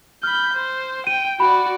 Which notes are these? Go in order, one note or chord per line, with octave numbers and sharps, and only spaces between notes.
B5 F6 G6
C5
G5 D#7
F#4 D5 B5